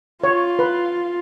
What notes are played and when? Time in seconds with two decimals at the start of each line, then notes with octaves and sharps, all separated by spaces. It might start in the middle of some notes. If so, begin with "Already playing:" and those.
0.24 F4 C#5
0.59 B4